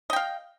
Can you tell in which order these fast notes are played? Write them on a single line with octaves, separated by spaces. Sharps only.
D#5 G5 F5